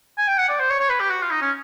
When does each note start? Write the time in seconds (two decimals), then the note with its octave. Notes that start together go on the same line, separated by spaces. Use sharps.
0.18 G#5
0.28 G5
0.38 F#5
0.49 D5
0.59 C5
0.70 C#5
0.80 C#5
0.89 B4
1.00 G4
1.10 F#4
1.22 F4
1.31 D#4
1.41 C#4